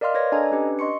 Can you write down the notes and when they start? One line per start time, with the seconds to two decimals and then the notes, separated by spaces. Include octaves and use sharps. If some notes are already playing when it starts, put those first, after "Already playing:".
0.01 A#4 D5 D#5 F5 C6 F6
0.14 B4 C#5 D5 G#6 A#6
0.32 D4 A4 D#5 G#5 A#5
0.52 C#4 D4 G4 B4
0.79 D#5 C6 C#6 C#7